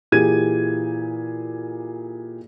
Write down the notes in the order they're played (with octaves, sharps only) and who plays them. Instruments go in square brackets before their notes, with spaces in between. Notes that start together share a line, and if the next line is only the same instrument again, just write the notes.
[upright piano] A#2 E3 G4 G#4 G#6 D#7